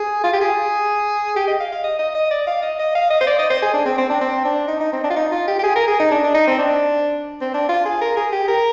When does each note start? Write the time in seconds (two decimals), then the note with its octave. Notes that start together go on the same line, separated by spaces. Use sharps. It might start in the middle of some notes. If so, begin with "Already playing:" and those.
Already playing: G#4
0.24 F4
0.33 G4
0.41 G#4
1.36 G4
1.48 D#5
1.60 F5
1.72 F5
1.84 D#5
1.99 D#5
2.15 D#5
2.31 D5
2.47 F5
2.63 D#5
2.79 D#5
2.95 F5
3.10 D#5
3.21 C5
3.27 D5
3.39 D#5
3.50 C5
3.62 G#4
3.74 D4
3.86 C4
3.98 C4
4.10 D4
4.21 C4
4.45 D4
4.68 D#4
4.80 D#4
4.93 C4
5.04 D4
5.10 F4
5.16 D#4
5.32 F4
5.48 G4
5.59 G4
5.64 G#4
5.76 A#4
5.88 G#4
6.00 D#4
6.11 D4
6.23 D4
6.34 D#4
6.47 C4
6.59 D4
7.41 C4
7.54 D4
7.69 F4
7.85 G#4
8.01 A#4
8.17 G#4
8.32 G4
8.48 A#4